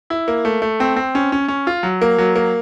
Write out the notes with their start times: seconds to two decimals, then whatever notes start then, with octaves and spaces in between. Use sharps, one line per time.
0.10 E4
0.28 A#3
0.45 A3
0.62 A3
0.80 C4
0.96 C4
1.15 C#4
1.32 C#4
1.48 C#4
1.67 F4
1.83 F#3
2.02 A#3
2.18 F#3
2.36 A#3